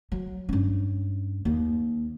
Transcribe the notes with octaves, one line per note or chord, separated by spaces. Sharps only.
F#3
G2 C#4
D#2